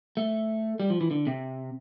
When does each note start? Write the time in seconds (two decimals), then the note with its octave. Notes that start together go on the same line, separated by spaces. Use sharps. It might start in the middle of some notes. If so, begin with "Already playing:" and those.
0.17 A3
0.80 G3
0.90 F3
1.01 E3
1.11 D3
1.27 C3